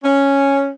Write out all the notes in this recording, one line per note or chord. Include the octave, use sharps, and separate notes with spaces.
C#4